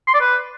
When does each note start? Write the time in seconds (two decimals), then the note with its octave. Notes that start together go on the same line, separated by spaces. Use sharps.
0.07 C6
0.14 D5
0.21 B4